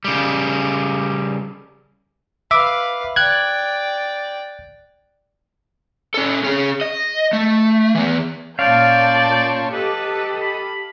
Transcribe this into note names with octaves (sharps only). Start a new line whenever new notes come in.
C#3 G3
B4 E5 F5 D6
D5 G5 F#6 G#6
C#4 A4
C#4 G#4
D#5
A3
E3 B3
A#2 C#4 C#5 D5 F5 A5 C6 G6
G4 A4 B4 D#5
B5